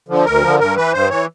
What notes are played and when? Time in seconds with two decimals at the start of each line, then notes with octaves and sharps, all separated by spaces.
0.09 D3 F3
0.25 D2 A#4
0.42 D3 F3
0.60 G2 A#4
0.76 E3 B4
0.93 G2 C5
1.10 E3 C#5